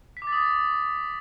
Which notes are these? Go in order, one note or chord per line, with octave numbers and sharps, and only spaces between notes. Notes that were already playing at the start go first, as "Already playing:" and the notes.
B6
D6
A6
D#6
A6